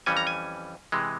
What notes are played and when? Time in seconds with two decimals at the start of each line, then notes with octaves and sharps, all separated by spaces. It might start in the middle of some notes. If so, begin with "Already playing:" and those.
0.06 F2 E3 G3 C#4 G#5
0.17 A#5
0.27 G#5
0.92 C3 E3 G#3